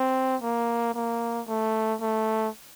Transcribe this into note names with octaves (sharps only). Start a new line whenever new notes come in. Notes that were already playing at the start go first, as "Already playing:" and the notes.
Already playing: C4
A#3
A#3
A3
A3